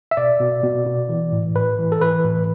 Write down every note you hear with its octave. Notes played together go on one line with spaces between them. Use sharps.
E5
B2 D5
B2
B2
B2
E3
A2
A2 B4
E3
A4
E3 B4
A2